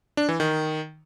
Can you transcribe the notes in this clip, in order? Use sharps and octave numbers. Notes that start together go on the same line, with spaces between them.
D4
E3
D#3